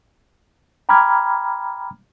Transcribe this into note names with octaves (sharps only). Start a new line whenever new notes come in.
G5 A#5 B5 D6 F6 G#6